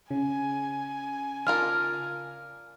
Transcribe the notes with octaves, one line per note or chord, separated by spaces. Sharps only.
C#3 G#5
D4 F4 A#4 F6